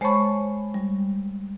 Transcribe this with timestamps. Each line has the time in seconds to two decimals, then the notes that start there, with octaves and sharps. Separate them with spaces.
0.01 G#3 C5 C#5 A5 B5 C#6
0.74 G3